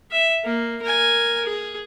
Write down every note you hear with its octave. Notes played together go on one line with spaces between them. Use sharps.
E5
A#3
A#4 G#5
G#4